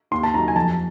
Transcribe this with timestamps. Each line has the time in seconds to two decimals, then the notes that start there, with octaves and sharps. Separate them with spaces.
0.11 D#2 C6
0.23 A5
0.34 D#3 F#3 A#5
0.48 G#5
0.55 F2 A5